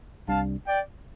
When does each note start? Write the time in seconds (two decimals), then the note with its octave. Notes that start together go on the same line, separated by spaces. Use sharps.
0.28 C2 C3 G3 D4 F5 A5
0.67 D5 G5